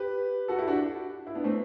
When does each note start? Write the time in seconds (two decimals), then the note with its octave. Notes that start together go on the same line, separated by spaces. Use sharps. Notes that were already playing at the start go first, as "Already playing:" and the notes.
Already playing: G4 B4
0.48 F#4 A4
0.58 E4 G4
0.68 D4 F#4
1.27 E4
1.35 B3 D4
1.44 A3 C4